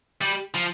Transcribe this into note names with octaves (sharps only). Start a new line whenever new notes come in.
G3
F3